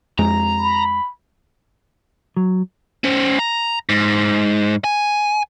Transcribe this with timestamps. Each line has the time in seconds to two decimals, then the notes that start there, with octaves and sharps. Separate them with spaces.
0.19 F2 G#3 A#5
0.59 B5
2.37 F#3
3.04 C#4 C5
3.39 A#5
3.89 G#2
4.84 G#5